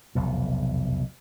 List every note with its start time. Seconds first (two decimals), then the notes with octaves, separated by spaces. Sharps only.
0.15 F1 B1 E2